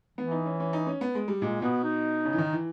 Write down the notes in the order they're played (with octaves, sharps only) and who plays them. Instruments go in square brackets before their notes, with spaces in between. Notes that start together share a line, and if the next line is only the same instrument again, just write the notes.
[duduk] E3 [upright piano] B3
[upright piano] D#4
C#4
C#4
D#4
C#4
B3
G#3
G3
[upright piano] A#2 [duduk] G#3
[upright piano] B2 [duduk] B3
[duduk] D#4
[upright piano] C#3
E3
D#3
E3